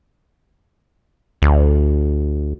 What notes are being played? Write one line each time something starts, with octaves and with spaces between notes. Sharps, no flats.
D2